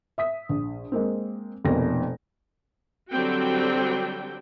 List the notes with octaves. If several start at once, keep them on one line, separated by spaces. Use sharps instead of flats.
E5 D#6 B6
A#1
G#3 A#3 C4
F1 F2 B2 A#3 A#6
D3 F#3 G3 C4 F#4 G5